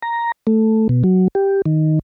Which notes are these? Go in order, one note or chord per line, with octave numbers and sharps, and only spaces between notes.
A#5
A3
B2
F#3
G4
D#3